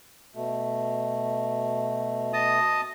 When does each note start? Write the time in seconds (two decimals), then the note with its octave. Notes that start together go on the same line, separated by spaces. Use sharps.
0.35 B2 A3
2.33 D#5 A5 D#6